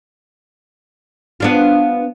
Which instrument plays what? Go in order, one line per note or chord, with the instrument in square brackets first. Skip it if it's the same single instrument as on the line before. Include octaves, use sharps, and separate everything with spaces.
[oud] B3 D4 F4